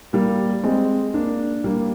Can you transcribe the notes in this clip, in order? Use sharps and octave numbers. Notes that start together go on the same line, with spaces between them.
G3 A#3
G#3 C4
A#3 D4
G3 A#3